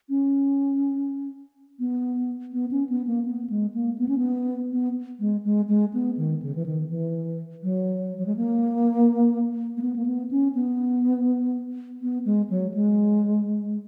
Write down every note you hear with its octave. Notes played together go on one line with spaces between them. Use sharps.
C#4
B3
B3
C#4
B3
A#3
B3
G#3
A#3
B3
C#4
B3
B3
G#3
G#3
G#3
B3
D#3
C#3
E3
D#3
E3
F#3
F#3
G#3
A#3
A#3
B3
A#3
B3
C#4
B3
B3
G#3
F#3
G#3